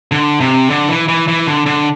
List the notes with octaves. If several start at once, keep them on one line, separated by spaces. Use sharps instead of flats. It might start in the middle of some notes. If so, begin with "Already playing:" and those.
D3
C3
D3
E3
E3
E3
D3
D3